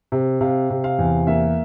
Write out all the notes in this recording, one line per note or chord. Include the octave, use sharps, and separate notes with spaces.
C3
C3 F5
C3
F5
E2
A#3 E5